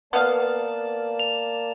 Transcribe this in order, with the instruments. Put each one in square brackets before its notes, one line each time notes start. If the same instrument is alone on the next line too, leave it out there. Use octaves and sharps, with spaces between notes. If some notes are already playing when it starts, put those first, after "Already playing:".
[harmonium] A#3 D5 A5 [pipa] B3 F5
[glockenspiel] F7